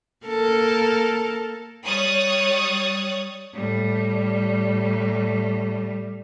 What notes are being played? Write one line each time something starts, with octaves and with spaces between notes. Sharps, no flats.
A#3 A4 A#4
G3 C#5 D#6 F#6 A6
A2 G3